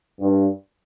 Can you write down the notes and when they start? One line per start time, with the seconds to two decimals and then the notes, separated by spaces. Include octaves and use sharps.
0.20 G2